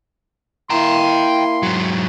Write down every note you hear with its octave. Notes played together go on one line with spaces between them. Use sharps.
A#3 E4 G5 A#5 C6
G#2 F#3